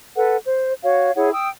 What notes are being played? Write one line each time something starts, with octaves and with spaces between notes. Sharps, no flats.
A4 B4 F#5
C5
F#4 C#5 F5
E4 G#4 C#5 F#5
G5 D#6 E6